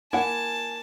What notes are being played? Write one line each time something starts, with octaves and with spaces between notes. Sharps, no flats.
A#3 E4 F#5 G#5 A5